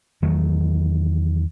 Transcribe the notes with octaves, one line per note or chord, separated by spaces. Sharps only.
E2 D#3 F#3 A3